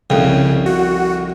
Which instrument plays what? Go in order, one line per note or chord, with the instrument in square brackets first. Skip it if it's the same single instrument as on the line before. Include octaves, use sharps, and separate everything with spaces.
[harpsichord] C2 F2 [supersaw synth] C#3
[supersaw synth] F#4